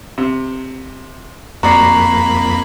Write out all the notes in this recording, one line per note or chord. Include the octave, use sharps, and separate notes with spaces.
C3
F2 A#3 F#4 D5 A#5 B5 C7